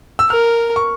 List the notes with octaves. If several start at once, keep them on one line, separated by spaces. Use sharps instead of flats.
E6
A#4 F6
C#6